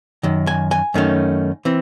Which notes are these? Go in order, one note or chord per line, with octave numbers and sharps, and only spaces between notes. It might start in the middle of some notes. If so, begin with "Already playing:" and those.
F#2 D#3
G#5
G#5
F#2 D#3 A3 C#4
E3 C4